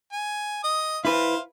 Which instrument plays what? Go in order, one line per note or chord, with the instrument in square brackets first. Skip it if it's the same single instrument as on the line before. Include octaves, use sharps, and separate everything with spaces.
[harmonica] G#5
D#5 D#6
[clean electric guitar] E4 B4 [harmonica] C5 F5